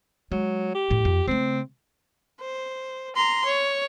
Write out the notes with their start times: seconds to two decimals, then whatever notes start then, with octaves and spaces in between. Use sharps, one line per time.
0.32 F#3 G#3
0.75 G4
0.91 F2 A2
1.05 F2
1.28 C#3 A3 C4
2.41 C5
3.16 A#5 C6
3.45 C#5